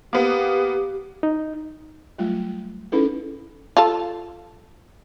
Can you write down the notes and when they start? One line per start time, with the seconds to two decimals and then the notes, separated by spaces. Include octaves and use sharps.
0.13 A#3 B3 G4
1.23 D#4
2.18 F#3 G3 A3 F4
2.92 C#4 D#4 E4 G#4 A4 B4
3.77 F4 A4